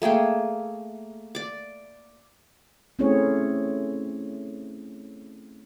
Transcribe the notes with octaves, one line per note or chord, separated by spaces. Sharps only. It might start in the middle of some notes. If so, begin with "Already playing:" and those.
A3 A#3 G#4 G5
D5 D6
A3 C4 C#4 E4 G#4 C#5